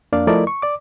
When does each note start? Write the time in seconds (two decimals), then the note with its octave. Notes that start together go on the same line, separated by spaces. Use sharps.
0.13 F2 A#3 D4 D5 F5
0.27 F3 A3 E4 A#4 D5 D#5
0.47 C#6
0.62 D5 D6